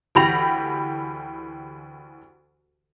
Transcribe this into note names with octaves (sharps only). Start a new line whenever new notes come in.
D2 E3 G4 B5 A#6 F7